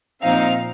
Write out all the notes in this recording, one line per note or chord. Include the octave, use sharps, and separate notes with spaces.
A#2 F3 C4 D#4 F5